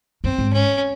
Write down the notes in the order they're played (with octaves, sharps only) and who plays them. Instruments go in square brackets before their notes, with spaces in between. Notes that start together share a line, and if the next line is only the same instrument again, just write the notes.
[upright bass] F#2 [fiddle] C4
[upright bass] G#2
[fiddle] C#4